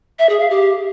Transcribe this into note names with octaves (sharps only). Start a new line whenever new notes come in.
E5
G#4
F5
G4